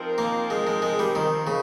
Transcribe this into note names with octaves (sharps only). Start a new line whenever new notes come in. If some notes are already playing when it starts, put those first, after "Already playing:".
Already playing: F3 C4 D#4 A#4
A#3
G#3
G#3
G#3
G3
D#3
C#3